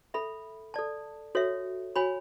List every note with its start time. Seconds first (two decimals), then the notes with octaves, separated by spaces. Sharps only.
0.14 A4 E5 B5
0.74 A4 D5 A5
1.35 F#4 A4 C#5 E5
1.96 F#4 C#5 G#5 B5